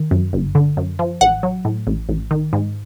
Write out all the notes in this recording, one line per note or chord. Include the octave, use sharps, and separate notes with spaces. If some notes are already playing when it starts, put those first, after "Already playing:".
Already playing: D#3
F#2
G1
D3
F#2
F3
A1 F#5
F#3
A2
A1
A1
D#3
G#2